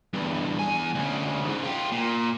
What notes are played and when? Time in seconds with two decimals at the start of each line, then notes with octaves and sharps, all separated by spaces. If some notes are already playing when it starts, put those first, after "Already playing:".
0.13 E2 G2
0.59 E2 G#5
0.95 D2 C#3
1.44 D2 G#2
1.64 F4 G4
1.92 A#2